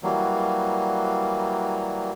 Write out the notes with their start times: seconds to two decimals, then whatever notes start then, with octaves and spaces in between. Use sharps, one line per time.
0.03 E3 F#3 G3 A#3